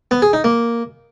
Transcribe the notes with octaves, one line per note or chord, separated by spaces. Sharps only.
B3
G#4
D#4
A#3